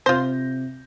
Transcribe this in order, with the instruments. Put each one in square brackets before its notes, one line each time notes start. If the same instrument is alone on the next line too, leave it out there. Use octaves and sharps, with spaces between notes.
[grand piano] C3 G6 A#6 [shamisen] F4 C5